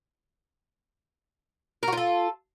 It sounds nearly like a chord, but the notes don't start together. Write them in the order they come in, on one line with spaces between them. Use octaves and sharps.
A#4 F#4 F4 A4